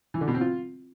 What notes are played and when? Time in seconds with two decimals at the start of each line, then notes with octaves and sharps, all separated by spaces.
0.14 E3
0.21 D3
0.28 B2
0.34 C4
0.41 F4